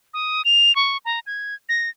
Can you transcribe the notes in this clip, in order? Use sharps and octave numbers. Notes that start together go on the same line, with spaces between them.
D#6
F7
C#6
A#5
G#6
A#6